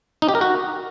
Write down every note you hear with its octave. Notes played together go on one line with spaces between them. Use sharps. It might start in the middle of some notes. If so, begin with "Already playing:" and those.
D#4
G4
A#4
F#4